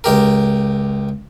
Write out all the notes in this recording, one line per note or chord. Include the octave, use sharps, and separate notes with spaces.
C#2 G4 A#4